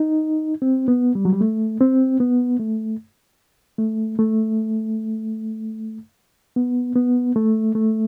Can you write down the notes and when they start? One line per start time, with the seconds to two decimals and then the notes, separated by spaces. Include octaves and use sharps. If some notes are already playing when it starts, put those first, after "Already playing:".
Already playing: D#4
0.62 C4
0.88 B3
1.15 G3
1.25 F#3
1.33 G3
1.41 A3
1.81 C4
2.20 B3
2.60 A3
3.79 A3
4.19 A3
6.56 B3
6.96 B3
7.36 A3
7.75 A3